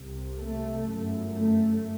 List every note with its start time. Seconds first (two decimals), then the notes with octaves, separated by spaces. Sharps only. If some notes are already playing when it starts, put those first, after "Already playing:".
Already playing: C2 C3
0.38 A3
0.83 F#2
0.89 G1
1.30 A3